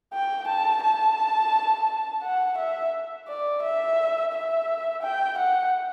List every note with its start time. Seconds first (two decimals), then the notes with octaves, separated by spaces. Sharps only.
0.14 G5
0.48 A5
0.83 A5
2.23 F#5
2.58 E5
3.28 D5
3.62 E5
4.33 E5
5.03 G5
5.38 F#5